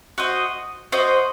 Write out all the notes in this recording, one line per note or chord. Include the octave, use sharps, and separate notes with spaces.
F#4 C5 D#5
F#4 C5 D#5